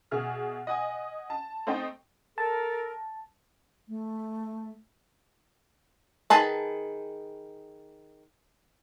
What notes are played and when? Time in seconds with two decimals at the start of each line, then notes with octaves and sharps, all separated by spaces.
0.11 B2 G#4 E5 F6
0.67 D#5 F#5 G#5 D#6
1.30 A5
1.67 A3 C4 D#4 C5 D#5 G5
2.38 A4 A#4 A5
3.89 A3
6.30 D#3 G#4 B4 A5